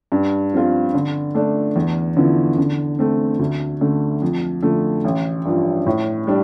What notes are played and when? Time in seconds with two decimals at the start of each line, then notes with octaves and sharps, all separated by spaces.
0.12 G2
0.53 F3 C4 F4
0.94 D3
1.35 A3 D4
1.76 E2
2.17 D3 F3 B3 E4
2.58 D3
2.99 A3 C4
3.39 D2
3.81 D3 A3
4.22 F2
4.63 D3 F3 A3
5.05 A1
5.45 G2 F3
5.86 A2
6.27 G3 D4